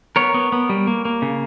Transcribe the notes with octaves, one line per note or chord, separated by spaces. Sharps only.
B3 A#4 C#5
B3
B3
G3
A#3
A#3
C#3